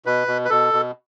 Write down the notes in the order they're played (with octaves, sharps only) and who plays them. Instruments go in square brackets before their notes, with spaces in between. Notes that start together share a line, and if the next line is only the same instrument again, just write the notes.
[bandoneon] B2 B4
B2
B4
B2 A4
B2